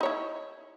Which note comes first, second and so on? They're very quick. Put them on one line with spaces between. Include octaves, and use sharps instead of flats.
D#4 C#5 E4